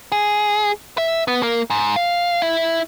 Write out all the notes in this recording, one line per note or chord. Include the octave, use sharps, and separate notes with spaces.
G#4
E5
B3
A#3
G#2
F5
E4